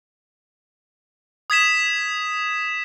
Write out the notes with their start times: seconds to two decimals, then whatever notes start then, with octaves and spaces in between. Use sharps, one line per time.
1.50 D#6 G#6 B6 E7